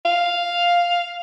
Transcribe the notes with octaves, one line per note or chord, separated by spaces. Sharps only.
F5